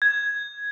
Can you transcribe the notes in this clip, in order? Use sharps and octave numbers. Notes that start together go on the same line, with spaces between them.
G#6